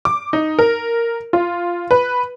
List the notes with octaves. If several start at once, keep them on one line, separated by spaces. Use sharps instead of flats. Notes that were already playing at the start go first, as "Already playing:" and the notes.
D6
D#4
A#4
F4
B4